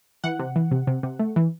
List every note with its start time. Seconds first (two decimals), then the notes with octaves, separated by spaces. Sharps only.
0.24 E3 F#5
0.39 C3
0.56 E3
0.71 C3
0.87 C3
1.03 C3
1.19 A3
1.36 E3